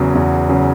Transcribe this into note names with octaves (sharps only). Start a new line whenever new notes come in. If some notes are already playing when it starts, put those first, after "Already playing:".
Already playing: E2 C#3 F#3
E2
C#3 F#3